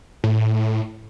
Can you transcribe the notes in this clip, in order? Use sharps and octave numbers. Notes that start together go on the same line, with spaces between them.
A2